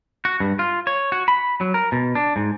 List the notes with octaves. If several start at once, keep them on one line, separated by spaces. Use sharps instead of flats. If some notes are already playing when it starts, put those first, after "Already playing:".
F#4
G2
F4
C#5
F#4
B5
F#3
A#4
B2
D4
G#2